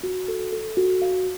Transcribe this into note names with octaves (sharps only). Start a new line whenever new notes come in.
F#4
A4
A4
F#4
F5